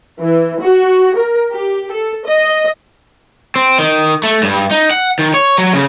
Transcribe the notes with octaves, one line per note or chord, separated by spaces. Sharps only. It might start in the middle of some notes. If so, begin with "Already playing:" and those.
E3
F#4
A#4
G4
A4
D#5
C4
D#3
A3
G2
D#4
F#5
D#3
C#5
F#3
C#3